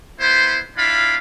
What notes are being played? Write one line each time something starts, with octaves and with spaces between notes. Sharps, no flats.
B3 E4 C5
D4 E4 F4 F5 B5